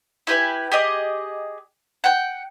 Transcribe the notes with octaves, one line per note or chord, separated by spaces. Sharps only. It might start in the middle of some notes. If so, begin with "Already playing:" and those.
E4 G4 B4 G#5
G4 G#4 D#5
F#5 G5